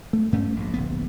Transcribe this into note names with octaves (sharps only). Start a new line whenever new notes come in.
A3
G2 A3 C#4
A#1 G#2
D1 A#1 B3